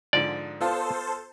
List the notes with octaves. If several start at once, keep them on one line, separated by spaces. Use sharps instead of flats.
G#2 D3 F3 D5
B3 F4 A4 C5 A5